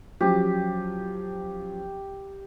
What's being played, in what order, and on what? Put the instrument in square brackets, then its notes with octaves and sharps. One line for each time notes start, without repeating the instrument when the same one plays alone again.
[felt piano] F3 F#3 C#4 [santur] G4